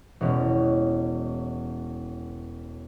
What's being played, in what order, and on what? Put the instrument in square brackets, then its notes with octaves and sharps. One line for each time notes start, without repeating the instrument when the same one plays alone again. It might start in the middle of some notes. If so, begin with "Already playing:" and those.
[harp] E1 B2 C#4